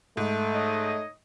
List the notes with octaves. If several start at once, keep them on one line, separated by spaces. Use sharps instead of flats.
G#2 A3
D#4 C#5 D#5